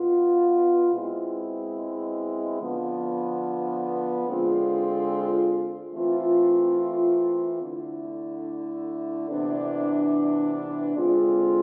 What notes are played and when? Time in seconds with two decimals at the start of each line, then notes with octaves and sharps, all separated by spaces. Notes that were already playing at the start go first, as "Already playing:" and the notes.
Already playing: B2 B3 F4
0.92 B2 G#3 C4 E4
2.60 D3 F3 B3
4.27 D3 G#3 C4 F4
5.94 E3 A3 C4 F4
7.61 D3 A3 E4
9.29 C3 E3 B3 D4
10.96 D3 G#3 C4 F4